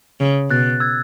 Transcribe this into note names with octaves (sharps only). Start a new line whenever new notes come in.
C#3
B2 F#6 A6
E6 G#6